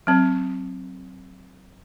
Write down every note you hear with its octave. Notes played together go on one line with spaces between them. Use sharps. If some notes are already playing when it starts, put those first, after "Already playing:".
F#3 C4